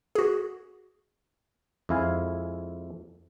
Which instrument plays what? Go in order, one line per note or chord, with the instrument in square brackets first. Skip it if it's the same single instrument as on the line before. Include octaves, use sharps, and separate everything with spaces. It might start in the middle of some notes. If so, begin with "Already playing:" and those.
[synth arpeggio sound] F#4 G#4
[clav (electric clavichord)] F2 G#3 E4 F5 G#5